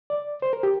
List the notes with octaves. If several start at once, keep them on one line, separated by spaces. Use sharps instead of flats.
D5
C5
A#4
G4